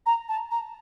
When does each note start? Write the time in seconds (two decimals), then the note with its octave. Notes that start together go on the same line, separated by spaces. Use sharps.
0.06 A#5
0.29 A5
0.51 A#5